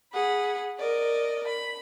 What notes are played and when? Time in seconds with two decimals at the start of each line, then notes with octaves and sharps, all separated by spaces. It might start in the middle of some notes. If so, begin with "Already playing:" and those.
0.13 G#4 F#5 B5
0.78 A#4 D5 D#5
1.47 B5